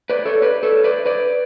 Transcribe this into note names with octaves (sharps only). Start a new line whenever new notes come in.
B4 D5
A4 C#5
B4 D5
A4 C#5
B4 D5
B4 D5